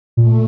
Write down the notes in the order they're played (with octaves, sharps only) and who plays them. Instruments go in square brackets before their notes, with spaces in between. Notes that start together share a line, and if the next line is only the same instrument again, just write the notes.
[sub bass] A#2 [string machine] A3